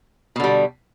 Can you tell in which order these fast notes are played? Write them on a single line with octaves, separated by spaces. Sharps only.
B2 D3 G3